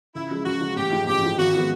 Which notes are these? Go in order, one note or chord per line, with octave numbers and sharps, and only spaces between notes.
C#2 E4
C#3 F3 G#3
C#2 F#4
C#3 F3 G#3
A1 G4
G#2 F3
A1 G4
G#2 F3
G#1 F#4
F3 G#3 B3